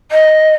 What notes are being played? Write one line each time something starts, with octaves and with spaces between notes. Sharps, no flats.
D#5